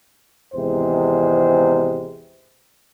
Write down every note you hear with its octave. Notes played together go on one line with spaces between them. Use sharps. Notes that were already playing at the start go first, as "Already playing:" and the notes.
G#1 E2 C3 G#3 C5